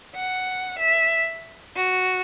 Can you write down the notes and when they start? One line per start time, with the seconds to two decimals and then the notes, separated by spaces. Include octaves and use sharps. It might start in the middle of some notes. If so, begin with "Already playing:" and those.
0.15 F#5
0.79 E5
1.76 F#4